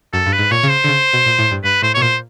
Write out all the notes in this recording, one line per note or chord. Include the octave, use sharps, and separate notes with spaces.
F#2 A4
G2
B4
G#2
A#2 C#5
C#3
C5
D3
C#3
B2
A#2
A2
G2
G2 B4
A2 C5
B2 C#5
A#2 C5